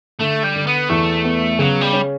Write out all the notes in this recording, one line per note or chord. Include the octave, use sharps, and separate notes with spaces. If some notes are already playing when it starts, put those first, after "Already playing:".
D3 A3
G3
D3
B3
E2 A3
B3
C#3 F#3
G3
C#4